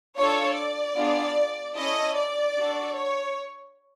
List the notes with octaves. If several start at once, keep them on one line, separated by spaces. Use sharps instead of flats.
D4 F4 A4 C#5
D5
B3 D4 F4 G#4
C#4 E4 A4 D#5
D5
D4 F#4 A4
C#5